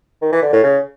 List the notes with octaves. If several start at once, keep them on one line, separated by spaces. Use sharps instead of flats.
D#3
E3
D3
A2
C#3